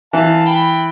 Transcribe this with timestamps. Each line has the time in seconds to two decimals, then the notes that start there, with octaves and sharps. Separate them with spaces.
0.13 E3 F5 A5
0.46 G5 B5